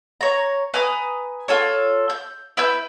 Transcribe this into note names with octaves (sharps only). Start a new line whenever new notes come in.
C#5 A#5
B4 G#5 A#5 D#6
F4 A4 C#5
G6
E4 B4 E6 G6